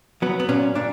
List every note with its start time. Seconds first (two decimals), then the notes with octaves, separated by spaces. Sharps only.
0.22 F#3 B3
0.40 B3
0.49 A#2 C#4
0.75 A#2 D4